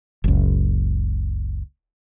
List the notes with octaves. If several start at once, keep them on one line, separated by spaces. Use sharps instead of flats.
F#1 C#2